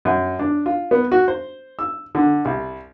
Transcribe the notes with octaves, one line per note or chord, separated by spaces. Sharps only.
F#2
D4
F4
B3
F#4
C5
E6
D3
C2